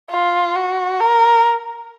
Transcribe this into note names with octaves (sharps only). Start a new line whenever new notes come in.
F4
F#4
A#4